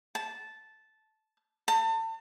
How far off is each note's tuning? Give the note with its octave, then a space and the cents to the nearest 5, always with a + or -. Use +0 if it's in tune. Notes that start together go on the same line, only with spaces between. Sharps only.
A5 -10
A5 +35